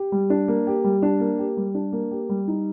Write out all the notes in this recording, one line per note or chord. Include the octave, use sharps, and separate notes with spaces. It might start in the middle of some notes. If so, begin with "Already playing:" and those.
Already playing: G4
G3
D4
A#3
G4
G3
D4
A#3
G4
G3
D4
A#3
G4
G3
D#4